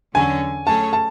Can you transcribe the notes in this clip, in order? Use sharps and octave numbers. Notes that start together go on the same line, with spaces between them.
E2 D3 F#3 C#4 G#5
F#3 A3 C#4 G#4 C#5 A5
A5